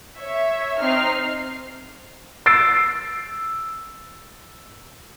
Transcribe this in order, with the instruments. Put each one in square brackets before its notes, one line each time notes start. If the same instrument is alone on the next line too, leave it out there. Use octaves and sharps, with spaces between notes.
[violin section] C#5 E5
C4 D#4 F6 C7
[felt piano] E6 A6 C7 D7